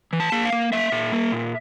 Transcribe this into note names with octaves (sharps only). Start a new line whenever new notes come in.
E3
A5
A#3
F5
A#3
A#3 E5
A#2
A#3
A#2